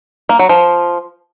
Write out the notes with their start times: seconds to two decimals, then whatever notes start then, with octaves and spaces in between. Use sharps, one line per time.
0.29 A#3
0.39 F#3
0.49 F3